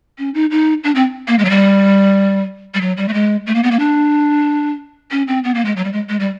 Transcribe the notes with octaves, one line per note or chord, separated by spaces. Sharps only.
C#4
D#4
D#4
D4
C4
A#3
G#3
F#3
G3
G3
F#3
G3
A3
G#3
A3
A#3
B3
A#3
D4
C#4
C4
B3
A#3
G#3
F#3
G3
G#3
G#3
G3